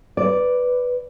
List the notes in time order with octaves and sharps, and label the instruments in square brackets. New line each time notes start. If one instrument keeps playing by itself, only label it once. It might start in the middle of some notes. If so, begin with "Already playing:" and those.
[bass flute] B4 [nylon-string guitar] D5